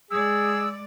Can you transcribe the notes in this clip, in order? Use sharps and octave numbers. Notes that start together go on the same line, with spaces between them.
G#3 G#4 D5 E6